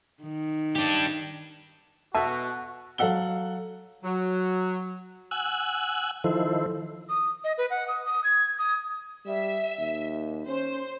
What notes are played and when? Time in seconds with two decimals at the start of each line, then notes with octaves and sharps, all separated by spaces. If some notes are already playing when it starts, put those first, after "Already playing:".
0.23 D#3
0.75 D4 G4
2.15 B2 F#4 A4 E5 A5
2.98 F#3 A4 F5 F#5 E6 G7
4.04 F#3
5.31 F#5 G#5 E6 F#6
6.24 D#3 F3 E4 A4 C5
7.09 D#6
7.44 D#5
7.58 B4
7.70 F#5
7.88 D#6
8.06 D#6
8.24 G#6
8.58 D#6
9.26 G3 E5
9.78 D#2
10.47 C#4 C5